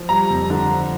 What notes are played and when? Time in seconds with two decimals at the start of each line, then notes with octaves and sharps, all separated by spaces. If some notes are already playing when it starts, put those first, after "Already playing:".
Already playing: F3
0.09 G3 A#5
0.30 F2
0.50 D3
0.71 F3